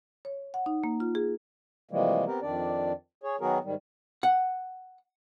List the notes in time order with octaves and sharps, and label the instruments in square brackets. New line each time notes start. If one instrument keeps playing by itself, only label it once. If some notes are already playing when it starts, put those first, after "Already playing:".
[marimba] C#5
F#5
D#4
A#3
F4
G#4
[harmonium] C3 E3 F3 G3 G#3 A#3
B3 C4 G4 A#4
F2 D#3 D4 D5
G#4 C#5
D#3 F#3 B3 F#4 G#4 A#4
G#2 D#3 G3
[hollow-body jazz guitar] F#5